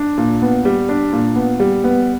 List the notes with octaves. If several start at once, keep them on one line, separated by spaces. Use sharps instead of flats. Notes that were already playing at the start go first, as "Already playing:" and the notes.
Already playing: D4
A#2
B3
G3
D4
A#2
B3
G3
B3